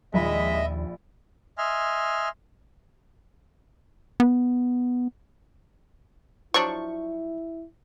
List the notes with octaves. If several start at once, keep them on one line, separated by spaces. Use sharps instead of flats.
A#1 D#2 G#3 F4 D#5 E5 B5
D#5 E5 G#5 C6 F6
B3
F3 F#3 D4 E4 C#6